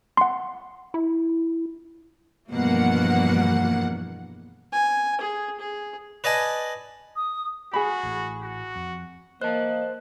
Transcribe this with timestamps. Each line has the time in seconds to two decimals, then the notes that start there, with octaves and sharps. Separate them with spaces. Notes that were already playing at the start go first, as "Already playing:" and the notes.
0.17 F#5 C6
0.94 E4
2.51 E2 G2 B2 F3 A#3 F#5
4.73 G#5
5.21 G#4
5.60 G#4
6.24 B4 D5 D#5 G#5 A5
7.16 D#6
7.73 F#4 G#4 B5
8.03 A1 A2
8.43 F#4
8.76 F2
9.41 A#3 C5 D#5 A5 F#6